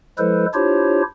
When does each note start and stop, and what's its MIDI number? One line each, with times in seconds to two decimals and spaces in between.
0.18 0.46 53
0.18 0.46 56
0.18 0.46 64
0.18 0.46 69
0.18 0.46 71
0.18 0.46 72
0.54 1.02 62
0.54 1.02 64
0.54 1.02 65
0.54 1.02 67
0.54 1.02 72
0.54 1.02 73